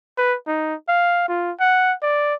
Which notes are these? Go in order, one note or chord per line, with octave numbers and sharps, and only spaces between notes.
B4
D#4
F5
F4
F#5
D5